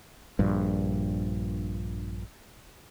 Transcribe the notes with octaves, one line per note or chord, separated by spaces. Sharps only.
A#1 G2